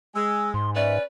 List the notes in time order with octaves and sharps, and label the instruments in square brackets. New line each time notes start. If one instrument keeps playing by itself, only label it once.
[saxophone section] G#3 [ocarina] E6
[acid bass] G#2 [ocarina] C6
[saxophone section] C#4 B4 [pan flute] D5 [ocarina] E5